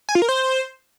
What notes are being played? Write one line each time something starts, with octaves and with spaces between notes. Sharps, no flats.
G#5
F4
A#4
C5